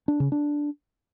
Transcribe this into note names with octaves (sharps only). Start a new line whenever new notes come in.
D4
C#3
D4